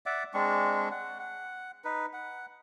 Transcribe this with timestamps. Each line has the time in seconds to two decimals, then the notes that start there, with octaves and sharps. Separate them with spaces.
0.06 D5 E5 F#5 D6
0.34 G#3 C4 D4 C#6
0.91 F#5
1.19 F#5
1.84 D#4 B4
2.13 F#5